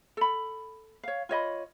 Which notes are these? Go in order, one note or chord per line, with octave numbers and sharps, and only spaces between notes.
A4 B5
C#5 F5
F4 C#5 D#5 B5